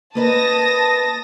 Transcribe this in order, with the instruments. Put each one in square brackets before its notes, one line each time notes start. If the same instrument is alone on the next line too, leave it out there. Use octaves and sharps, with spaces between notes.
[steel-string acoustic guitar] A#3 B4 D#5 [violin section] A5 D#6 A#6